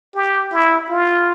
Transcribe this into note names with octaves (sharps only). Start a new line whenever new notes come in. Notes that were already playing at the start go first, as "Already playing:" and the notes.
G4
E4
F4